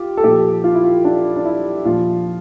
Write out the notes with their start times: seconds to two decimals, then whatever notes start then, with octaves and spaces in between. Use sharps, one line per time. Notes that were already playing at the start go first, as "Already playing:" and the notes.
Already playing: F4 G4
0.17 A4
0.24 A#2 F3 G4
0.64 F4
0.74 E4
0.83 F4
1.05 D4
1.36 D4
1.45 E4
1.85 A#2 F3 F4